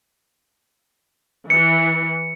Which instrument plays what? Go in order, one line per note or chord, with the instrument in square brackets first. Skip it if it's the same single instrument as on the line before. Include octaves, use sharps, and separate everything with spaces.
[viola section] E3 [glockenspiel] C#7